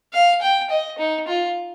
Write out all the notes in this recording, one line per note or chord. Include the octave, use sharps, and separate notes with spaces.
F5
G5
D#5
D#4
F4